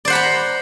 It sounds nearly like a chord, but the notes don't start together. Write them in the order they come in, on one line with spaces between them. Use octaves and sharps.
D5 C5 F#5 B5 A#5